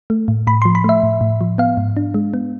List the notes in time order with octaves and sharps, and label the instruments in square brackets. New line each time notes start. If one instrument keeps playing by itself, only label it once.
[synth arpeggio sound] A3
A2
A2 B5
F3 C6
B5
A3 E5
A2
A2
F3
B3 F5
G#2
D4
G#3
B3